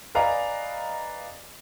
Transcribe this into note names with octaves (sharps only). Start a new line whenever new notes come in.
B4 D5 D#5 F5 G#5 A#5